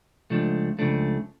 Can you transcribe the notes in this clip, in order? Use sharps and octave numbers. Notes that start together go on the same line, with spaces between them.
C#2 C#3 F3 A3 D4
C#2 C#3 F3 A3 D4